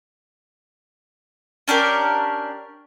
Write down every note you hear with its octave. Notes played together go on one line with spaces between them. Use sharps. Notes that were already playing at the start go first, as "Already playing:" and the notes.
C#4 D4 G4 A#4